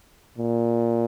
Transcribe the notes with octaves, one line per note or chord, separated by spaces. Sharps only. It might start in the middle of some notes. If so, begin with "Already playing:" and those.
A#2